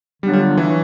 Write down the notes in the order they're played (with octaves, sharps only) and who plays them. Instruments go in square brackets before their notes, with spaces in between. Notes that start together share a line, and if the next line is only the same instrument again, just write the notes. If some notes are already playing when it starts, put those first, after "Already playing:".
[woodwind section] D3 F#3 B3 D4 F4 [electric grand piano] G3
[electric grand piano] G3
E3
[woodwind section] F#3